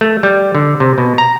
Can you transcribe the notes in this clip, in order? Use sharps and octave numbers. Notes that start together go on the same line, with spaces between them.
A3
G3
D3
C3
B2
A#5